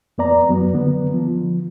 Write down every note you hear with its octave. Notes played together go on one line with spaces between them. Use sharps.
F2 B3 D5 A#5
F#2 F#3 B3
D3 B3
F3